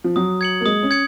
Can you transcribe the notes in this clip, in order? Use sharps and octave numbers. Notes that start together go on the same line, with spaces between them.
F3
F#3 D#6
G#6 C#7 F#7
A#3
G#3 D#6
C#4
G#6 C#7